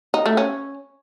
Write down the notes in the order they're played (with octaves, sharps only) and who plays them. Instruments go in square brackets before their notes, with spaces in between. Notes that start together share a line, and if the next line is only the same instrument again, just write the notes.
[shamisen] D#4
A3
C#4